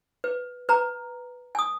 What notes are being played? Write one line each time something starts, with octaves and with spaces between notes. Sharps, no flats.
B4
B4 A#5
G#5 D#6